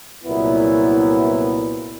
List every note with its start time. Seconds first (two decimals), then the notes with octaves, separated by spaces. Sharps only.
0.23 C2 A#2 F#3 B3 E4